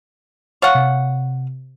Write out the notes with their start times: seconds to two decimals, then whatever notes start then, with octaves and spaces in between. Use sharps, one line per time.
0.62 C#5 F5 F#5 F6 A6
0.75 C3